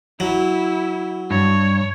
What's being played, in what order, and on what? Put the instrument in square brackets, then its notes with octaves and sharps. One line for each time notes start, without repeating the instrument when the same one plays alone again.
[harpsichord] F#3 [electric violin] E4
[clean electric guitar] G2 [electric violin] C#5